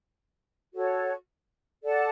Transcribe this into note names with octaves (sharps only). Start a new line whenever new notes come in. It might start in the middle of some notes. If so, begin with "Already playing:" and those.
F#4 A4 C#5
A4 D5 F#5 A5